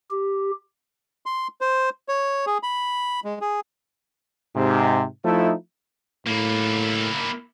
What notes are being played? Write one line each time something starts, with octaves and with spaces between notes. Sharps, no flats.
G4
C6
C5
C#5
G#4
B5
G#3
G#4
G#2 C3
F3 A3 D#4 E4
A2 A#3 E4